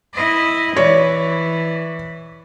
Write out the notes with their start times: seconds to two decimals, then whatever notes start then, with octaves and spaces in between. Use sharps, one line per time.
0.14 E4 D#5
0.76 E3 C#5 D5